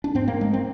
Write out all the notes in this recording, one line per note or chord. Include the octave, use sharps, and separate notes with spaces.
D4
G#2 C4
A#3
G#3
C4